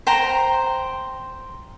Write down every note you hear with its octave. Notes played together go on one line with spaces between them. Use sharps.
C5 G5 A#5